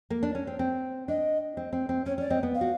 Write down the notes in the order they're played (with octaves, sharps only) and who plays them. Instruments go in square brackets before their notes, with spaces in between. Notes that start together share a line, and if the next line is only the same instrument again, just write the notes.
[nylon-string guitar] A#3
D4
C#4
C4
C4
[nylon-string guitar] D4 [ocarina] D#5
[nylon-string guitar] C4
C4
C4
[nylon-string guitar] C#4 [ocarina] C#5
[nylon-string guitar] C#4 [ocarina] D5
[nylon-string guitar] C4 [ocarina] D#5
[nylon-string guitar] B3
[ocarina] F5
[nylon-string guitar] F#4